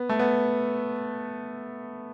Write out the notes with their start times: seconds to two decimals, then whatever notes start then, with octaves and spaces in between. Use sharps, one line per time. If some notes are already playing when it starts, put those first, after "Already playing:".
Already playing: B3
0.09 A3
0.19 B3